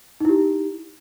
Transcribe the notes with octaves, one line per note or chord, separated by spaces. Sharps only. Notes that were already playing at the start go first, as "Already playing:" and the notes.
D#4 E4 G4